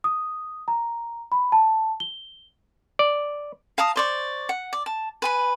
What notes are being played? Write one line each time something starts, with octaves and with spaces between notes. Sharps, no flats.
D#6
A#5
B5
A5
G7
D5
F5 A5 A#5 D#6
C5 D5 C#6
F#5
D5
A5
B4 G#5 B5